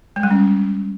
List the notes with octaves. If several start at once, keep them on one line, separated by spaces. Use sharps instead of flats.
G#3
G3
C#4